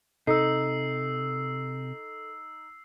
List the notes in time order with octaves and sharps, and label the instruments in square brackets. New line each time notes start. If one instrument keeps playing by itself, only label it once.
[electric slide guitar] C3 [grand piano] D#4 [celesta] A4 [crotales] E6 C7